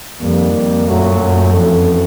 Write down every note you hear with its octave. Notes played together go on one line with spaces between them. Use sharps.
F2 D#3 G3 A#3
F2
F#2 A#2 F#3 A3
F#2
F2 E3 A3 C#4 F#4 A4